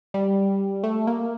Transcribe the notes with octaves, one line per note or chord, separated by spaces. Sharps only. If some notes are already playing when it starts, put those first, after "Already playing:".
G3
A3
A#3